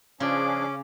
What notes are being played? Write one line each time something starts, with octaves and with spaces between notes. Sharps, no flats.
C#3 F3 C#4 D4 G#4 D6